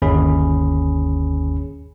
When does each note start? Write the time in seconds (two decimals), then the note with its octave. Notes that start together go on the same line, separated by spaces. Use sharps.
0.02 G1 D#2 C#4 G#4 B5